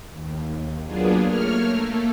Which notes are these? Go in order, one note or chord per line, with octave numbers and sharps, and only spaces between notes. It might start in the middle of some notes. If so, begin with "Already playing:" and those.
D#2
F#3 A#3 B3 D4 F4 G#4
A3 A#3 C#5 F6
A3 A#3 A4